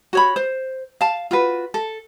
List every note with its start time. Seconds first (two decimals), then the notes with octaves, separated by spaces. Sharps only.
0.13 F#4 C#5 B5
0.36 C5
1.01 F5 A5
1.31 F4 F#4 B4
1.74 A4